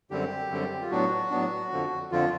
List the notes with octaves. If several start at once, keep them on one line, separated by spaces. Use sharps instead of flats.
F#2 D3 G3 C4 G4
F#2 D3 G3 C4
F4
A2 F#3 B3 D4 F#4
A2 F#3 B3 D4
F2 D3 F3
F2 D3 F3 F4